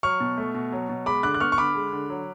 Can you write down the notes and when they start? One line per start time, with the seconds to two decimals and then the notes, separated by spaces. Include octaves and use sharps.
0.03 F#3 C#6 F6
0.20 B2
0.38 A3
0.54 B2
0.72 F#3
0.89 B2
1.06 G#3 B5 D6
1.23 D3 D6 F#6
1.34 F#6
1.40 B3 C#6 F6
1.52 C#6
1.58 D3 B5 D6
1.75 G#3
1.93 D3
2.10 F#3